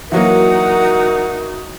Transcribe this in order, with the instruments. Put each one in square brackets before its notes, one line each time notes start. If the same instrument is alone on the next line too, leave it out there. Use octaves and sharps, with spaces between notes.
[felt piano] E3 F#3 A#3 [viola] D#4 F#4 [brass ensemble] A#4 [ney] F#5